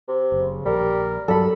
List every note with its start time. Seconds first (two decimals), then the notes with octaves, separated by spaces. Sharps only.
0.08 C3
0.32 F#1 C#3
0.66 A#1 G3 A#4
1.28 G2 F#3 G3 A4 B5